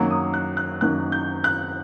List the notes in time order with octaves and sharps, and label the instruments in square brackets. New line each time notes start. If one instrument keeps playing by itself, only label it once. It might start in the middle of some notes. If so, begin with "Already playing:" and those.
Already playing: [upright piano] F#2 D#3 F#3 A#3
D#6
F#6
F#6
F#2 D#3 F#3 A#3 F#6
G6
F#6